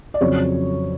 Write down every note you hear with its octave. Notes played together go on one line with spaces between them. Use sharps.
D5
F2 C#3 F#3 C#5